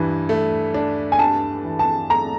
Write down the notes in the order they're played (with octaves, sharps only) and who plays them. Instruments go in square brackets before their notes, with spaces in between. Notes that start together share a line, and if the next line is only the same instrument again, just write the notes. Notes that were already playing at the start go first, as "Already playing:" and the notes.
Already playing: [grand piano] G2 E3
A3
D4
[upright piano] G#5
[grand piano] G2 [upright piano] A5
[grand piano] E3
[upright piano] A5
[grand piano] A3 [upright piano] A#5